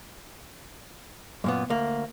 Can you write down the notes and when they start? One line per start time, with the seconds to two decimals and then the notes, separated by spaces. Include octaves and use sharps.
1.44 F#2 A#2 B3
1.70 D2 A#3